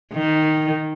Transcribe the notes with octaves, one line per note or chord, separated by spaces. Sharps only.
D#3